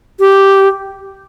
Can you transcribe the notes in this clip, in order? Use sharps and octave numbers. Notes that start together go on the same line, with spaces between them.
G4